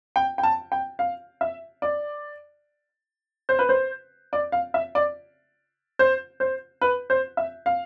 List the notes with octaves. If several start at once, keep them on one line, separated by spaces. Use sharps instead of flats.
G5
G5
A5
G5
F5
E5
D5
C5
B4
C5
D5
F5
E5
D5
C5
C5
B4
C5
E5
F5